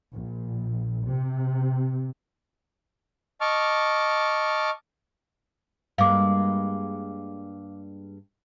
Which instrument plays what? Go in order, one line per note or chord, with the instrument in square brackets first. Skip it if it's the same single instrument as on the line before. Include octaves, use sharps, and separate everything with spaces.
[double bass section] A#1
C3
[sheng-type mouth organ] D#5 A5 C#6 D6 F6
[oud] G2 G#3 A#3 [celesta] F5 D6